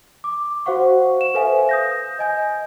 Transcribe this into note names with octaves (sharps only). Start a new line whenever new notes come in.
D6
F#4 C5 F5 F#5 C#6
E7
A4 B4 C5 E5 F5 G#5
D#6 G6 A#6
D#5 G#5 G6